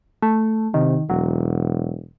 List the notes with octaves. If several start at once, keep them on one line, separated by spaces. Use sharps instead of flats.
A3
C3 D#3
E1 F#3